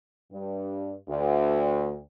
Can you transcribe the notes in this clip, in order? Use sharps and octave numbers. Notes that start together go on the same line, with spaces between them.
G2
D2